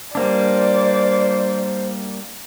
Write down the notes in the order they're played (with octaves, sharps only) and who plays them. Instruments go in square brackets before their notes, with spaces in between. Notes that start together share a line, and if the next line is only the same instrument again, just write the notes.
[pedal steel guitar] G3 A#3 D4 [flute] C5 [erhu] D5